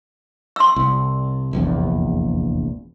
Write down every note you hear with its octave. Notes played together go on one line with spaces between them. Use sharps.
C6 E6
C2
F1 A#1 E2